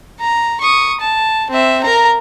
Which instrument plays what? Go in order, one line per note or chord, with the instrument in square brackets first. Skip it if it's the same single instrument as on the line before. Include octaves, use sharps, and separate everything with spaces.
[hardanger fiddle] A#5
C#6 D#6
A5
C4 E5
A#4 A#5